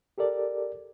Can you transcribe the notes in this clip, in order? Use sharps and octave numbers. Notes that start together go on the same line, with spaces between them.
G4 A4 A#4 D5